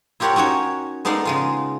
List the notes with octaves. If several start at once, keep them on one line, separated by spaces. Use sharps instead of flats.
E4 F4 G4 A#4 C#5 F#5
C#4 D#4 F#4 C#5
G#3 B3 D#4 A4 D5 F5
C#3 G#3 F4